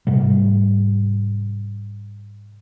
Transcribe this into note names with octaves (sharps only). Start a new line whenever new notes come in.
G#2 C3 G3